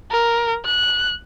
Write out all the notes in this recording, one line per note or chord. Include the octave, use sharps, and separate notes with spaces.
A#4
F#6